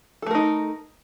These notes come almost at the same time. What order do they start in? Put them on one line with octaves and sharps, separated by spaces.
A4 A3 A#4 D#4